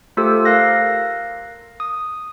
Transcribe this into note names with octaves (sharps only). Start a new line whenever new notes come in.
A3 F4 G4 A4 C5 E6
A#4 F5 F#6 A#6
D#6